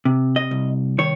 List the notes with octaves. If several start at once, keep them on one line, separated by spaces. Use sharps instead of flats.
C3
D#5
C2
D#3 C#5